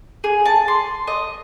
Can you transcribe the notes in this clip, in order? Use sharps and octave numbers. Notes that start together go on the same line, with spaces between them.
G#4
A5
C6
D#5